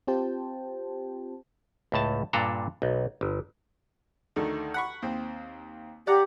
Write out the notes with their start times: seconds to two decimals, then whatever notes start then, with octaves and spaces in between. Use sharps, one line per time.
0.07 C4 F4 G4 C5 G5 A5
1.92 C#2 A2 A5
2.33 G2 A#2 D4 A4 A#5
2.82 B1
3.21 G1
4.36 D2 D#3 A3
4.74 F#5 B5 C#6
5.02 D#2 C4
6.07 G4 D5 F#5 A#5